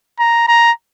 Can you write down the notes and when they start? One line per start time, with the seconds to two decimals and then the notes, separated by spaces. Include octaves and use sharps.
0.19 A#5
0.48 A#5